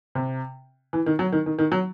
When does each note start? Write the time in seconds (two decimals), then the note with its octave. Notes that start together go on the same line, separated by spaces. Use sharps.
0.15 C3
0.93 E3
1.06 D#3
1.19 F#3
1.32 D#3
1.46 D#3
1.59 D#3
1.72 F#3